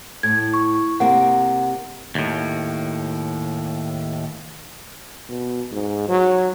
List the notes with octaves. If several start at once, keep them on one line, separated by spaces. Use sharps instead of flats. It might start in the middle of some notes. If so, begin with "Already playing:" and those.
A2 G#6
C#6
C3 A#3 F#5
D#2 A2
B2
G#2
F#3